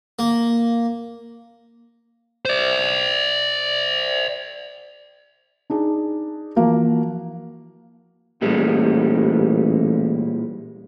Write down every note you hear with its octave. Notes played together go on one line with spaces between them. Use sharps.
A#3
C5 D5
D4 D#4 G#4
E3 F3 A#3 F#4 A#4
A1 A#2 G3 G#3